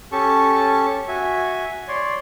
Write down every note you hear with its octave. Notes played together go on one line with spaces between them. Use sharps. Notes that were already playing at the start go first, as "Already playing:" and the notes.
C#4 G4 A4 A5 C#6
F#4 E5 G#5
C#5 D5 C6